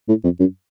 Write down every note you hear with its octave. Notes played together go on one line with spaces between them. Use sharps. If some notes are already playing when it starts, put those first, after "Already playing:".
A2
F2
F#2